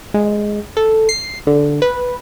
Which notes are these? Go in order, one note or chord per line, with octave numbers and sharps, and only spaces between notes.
G#3
A4
C7
D3
B4